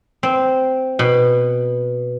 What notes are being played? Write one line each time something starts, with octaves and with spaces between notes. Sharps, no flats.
C4
B2